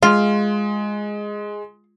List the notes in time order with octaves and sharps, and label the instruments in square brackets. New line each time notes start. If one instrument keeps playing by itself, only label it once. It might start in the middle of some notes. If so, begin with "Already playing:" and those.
[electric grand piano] G#3 [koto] F4 [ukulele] F5